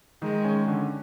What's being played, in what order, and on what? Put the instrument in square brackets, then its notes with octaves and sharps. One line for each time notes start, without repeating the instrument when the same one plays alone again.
[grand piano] D#3 [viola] G#3
[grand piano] C#4
D3